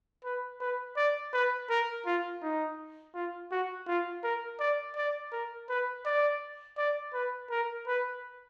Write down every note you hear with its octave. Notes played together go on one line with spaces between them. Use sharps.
B4
B4
D5
B4
A#4
F4
D#4
F4
F#4
F4
A#4
D5
D5
A#4
B4
D5
D5
B4
A#4
B4